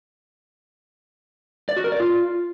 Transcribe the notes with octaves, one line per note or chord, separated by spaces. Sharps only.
D5
F#4
A#4
D5
F4